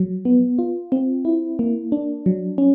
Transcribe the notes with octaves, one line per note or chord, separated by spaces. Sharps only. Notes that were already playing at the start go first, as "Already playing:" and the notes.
Already playing: F#3
B3
F4
C4
E4
A#3
D4
F#3
C#4